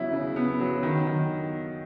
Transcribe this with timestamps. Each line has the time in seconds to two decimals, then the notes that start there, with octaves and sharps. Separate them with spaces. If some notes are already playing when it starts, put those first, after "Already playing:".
Already playing: C#3 F#3 B3 E4
0.12 C#3
0.36 B3
0.60 F#3
0.83 D#3
1.07 D#3